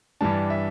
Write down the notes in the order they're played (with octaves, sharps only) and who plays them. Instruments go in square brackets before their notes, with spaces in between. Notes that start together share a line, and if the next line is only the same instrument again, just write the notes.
[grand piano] G2 E3 G3 D4 A5
E5